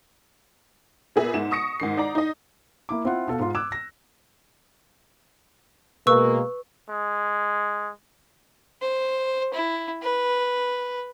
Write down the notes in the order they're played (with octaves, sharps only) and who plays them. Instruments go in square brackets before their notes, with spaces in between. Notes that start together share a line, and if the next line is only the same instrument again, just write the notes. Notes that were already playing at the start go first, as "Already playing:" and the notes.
[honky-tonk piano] A#2 B3 G#4 E5
G#2 E7
C#6 D#6 A#6 C#7
G#2 D#3 C7
D#4 D5 A#5
D#4 D#5
[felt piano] A#3 E4 D6
C4 E4 F4 F#5
B2 A4 F5
G#2 F4
D6 E6 F#6 G#6 E7
A#6
[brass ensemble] B2 G#3 A#3 [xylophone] B4 C#6 E6
[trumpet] G#3
[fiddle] C5
E4
B4